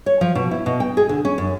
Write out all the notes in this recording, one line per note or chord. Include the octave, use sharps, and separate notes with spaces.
C#5
F3
B2
E4
B2
G5
G#4
D3
C#4
F#2